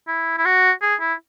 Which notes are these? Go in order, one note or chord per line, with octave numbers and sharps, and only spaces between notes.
E4
E4
F#4
G#4
E4